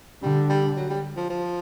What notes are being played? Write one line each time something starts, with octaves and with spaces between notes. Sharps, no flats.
D3 G3
G3
F#3
G3
F3
F3